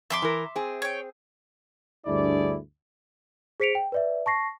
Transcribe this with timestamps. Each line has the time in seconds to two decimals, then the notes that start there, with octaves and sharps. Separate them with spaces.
0.10 F2 E5 C6 D6
0.22 E3 A#4
0.56 C4 G#4
0.82 C#5 G5
2.07 D2 G2 D4 E4 G#4 D5
3.60 G#4 C5 B6 C#7 D7 F7
3.75 G5
3.92 B4 D5 E5
4.26 A5 C#6 A#6 C7